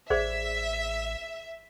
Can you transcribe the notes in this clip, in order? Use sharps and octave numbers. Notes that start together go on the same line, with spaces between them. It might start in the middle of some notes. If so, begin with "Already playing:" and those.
A1 G#4 C5 D5 E5